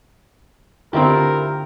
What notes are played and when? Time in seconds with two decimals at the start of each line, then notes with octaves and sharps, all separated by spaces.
0.93 D3 C4 E4 F4 G4 A#4